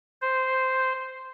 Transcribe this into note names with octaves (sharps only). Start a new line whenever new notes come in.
C5